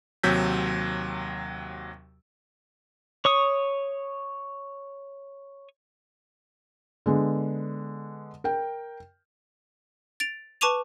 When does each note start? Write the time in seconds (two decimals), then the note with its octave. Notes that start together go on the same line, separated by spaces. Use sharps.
0.23 D#2 C3 F#3 E6 G6 B6
3.25 C#5 C#6 D#6
7.06 D3 G#3 B3
8.44 A#4 G5
10.20 A6 D7 F7
10.61 B4 A5 C#6 D6 D#7 F7